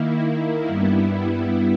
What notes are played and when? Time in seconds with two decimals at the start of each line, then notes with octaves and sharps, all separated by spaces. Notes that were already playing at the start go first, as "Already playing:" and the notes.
Already playing: D#3 A#3 E4
0.64 G2 G3 B3 E4